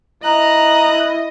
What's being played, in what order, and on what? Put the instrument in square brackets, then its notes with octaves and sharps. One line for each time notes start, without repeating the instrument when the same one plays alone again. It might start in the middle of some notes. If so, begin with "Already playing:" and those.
[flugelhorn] E4 [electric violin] D#5 [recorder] A#5 [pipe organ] F#6